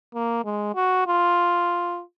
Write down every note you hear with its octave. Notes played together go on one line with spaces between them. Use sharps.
A#3
G#3
F#4
F4